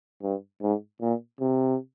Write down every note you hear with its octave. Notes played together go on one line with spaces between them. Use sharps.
G2
G#2
A#2
C3